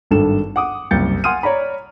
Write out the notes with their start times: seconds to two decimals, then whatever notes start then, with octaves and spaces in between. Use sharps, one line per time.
0.11 G#1 G2 A4 E7
0.56 F#5 D6 D#6
0.91 F#1 C2 G6 A6 C#7
1.24 F#5 G#5 C6 D#6 F6 D#7
1.43 C#5 D5 A#5 B5